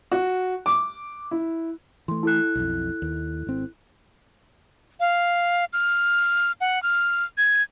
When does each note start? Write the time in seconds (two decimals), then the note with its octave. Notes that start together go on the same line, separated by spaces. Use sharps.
0.12 F#4
0.66 D6
1.31 E4
2.08 E3 A3 C6
2.23 E4 A4 F#6
2.55 B1 F2
3.02 D#2
3.47 G#1 C4
5.00 F5
5.73 F6
6.61 F#5
6.83 F6
7.38 G#6